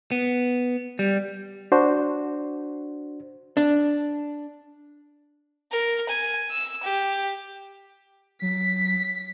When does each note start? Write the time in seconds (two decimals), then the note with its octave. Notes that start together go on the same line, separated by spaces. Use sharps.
0.12 B3
0.99 G3
1.72 D4 F#4 C5
3.57 D4
5.72 A#4
6.09 G#5
6.51 E6
6.83 G4
8.42 F#3 B6